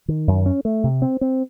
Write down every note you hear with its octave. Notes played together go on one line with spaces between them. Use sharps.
D#3
F#2
C#4
A3
C3
C4
C4